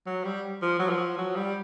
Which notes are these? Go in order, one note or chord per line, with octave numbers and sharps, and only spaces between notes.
F#3
G3
F3
F#3
F3
F#3
G3